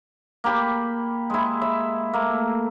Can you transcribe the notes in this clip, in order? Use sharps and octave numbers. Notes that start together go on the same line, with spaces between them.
A#3 G4 B5
G#3 E4
E5
A3 A#3